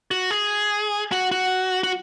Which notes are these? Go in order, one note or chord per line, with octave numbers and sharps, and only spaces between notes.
F#4
G#4
F#4
F#4
F#4